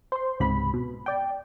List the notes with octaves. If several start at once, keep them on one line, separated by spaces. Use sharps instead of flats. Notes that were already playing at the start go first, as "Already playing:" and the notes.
C5 C6
C#2 G#2 C3 B5
B2
D5 G5